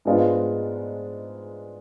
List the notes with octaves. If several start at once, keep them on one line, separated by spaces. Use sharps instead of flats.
G#2 G#3 B3 D4 F4